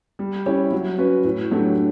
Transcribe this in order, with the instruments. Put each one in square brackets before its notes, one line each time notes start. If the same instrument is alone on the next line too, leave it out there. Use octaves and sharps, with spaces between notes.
[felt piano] G3
C#4 E4 G4 C#5
F#3
C#4 F#4 B4
A2
F#3 A3 D4 G4